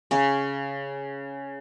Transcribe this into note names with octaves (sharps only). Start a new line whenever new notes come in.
C#3 C#4